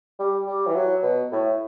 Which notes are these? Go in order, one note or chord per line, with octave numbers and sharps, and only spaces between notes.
G3
G3
E3
F#3
B2
A2